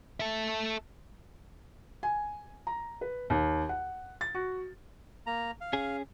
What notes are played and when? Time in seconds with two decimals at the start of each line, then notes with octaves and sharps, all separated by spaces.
0.20 A4 E5
2.03 G#5
2.67 A#5
3.01 B4
3.30 D#2
3.69 F#5
4.21 A6
4.35 F#4
5.27 A#3 A#5
5.61 F5
5.73 C#4 G#4